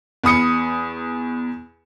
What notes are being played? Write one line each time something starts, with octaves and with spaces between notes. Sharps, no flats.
E2 B5 D#6 C#7